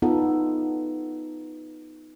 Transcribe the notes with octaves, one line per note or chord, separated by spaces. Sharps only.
B3 D#4 F4 A4